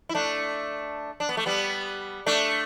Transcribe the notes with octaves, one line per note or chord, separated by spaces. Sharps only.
E4
A3 D4
D4
B3
A3
G3 B3
A3 D4